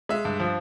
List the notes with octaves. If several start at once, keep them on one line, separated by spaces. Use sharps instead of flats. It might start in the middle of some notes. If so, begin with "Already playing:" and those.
G#3 E5
G2
F3